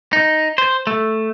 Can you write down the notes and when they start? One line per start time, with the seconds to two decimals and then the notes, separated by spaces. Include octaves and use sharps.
0.13 D#4
0.58 C5
0.87 A3